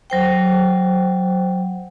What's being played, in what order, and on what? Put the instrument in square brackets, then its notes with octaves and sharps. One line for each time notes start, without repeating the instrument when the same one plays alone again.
[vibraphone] F#3 C5 G5